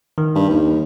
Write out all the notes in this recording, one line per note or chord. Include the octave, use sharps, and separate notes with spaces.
D#3
G2
D#2